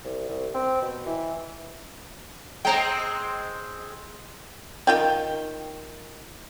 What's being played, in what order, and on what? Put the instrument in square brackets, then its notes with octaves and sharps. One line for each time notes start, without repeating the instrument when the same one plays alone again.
[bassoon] C2
C2
C4
B2
E3
[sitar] G#3 C4 [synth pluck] G5 A#5
[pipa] D#3 F4 G5